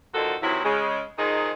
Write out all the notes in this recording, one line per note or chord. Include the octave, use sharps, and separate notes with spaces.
A#2 D3 D#3 F3 F#4 A4
C3 D#3 E3 F#3 E4
C#3 G#3
D#3 F3 G#3 D#4 G#4